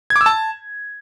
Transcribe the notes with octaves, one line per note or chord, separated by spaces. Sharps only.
G#6
D6
E6
A5